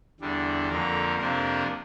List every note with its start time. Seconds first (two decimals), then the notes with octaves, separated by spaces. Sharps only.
0.20 E2 D3 G3 D4
0.69 F2 D3 F3 A#3 A#4
1.18 F2 C3 F3 A#3 D4 A#4